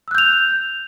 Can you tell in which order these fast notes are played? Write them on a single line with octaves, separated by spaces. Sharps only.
E6 F#6 G6 F7